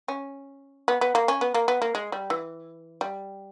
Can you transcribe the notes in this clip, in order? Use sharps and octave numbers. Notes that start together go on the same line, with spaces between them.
C#4
B3
B3
A#3
C#4
B3
A#3
B3
A#3
G#3
G3
E3
G3